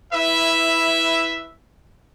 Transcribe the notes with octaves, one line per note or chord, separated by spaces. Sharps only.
E4 B4 E5